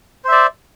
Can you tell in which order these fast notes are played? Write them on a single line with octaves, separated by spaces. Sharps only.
C5 E5 D5